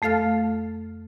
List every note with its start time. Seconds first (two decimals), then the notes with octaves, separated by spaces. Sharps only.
0.02 F2 A3 A4 F5 F6 A6